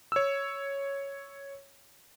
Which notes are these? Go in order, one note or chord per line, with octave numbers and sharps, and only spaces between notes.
C#5 E6